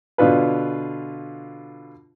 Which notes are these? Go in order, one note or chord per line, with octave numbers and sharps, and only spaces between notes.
B2 D3 F4 B4